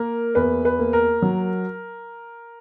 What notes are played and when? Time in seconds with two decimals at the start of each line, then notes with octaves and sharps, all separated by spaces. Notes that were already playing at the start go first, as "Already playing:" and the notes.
Already playing: A#3 A#4
0.35 E2 B4
0.65 B4
0.79 A#3
0.93 A#4
1.22 F#3